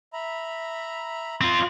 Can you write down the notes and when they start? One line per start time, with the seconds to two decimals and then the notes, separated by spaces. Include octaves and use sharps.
0.13 E5 A#5 B5
1.41 C4 F4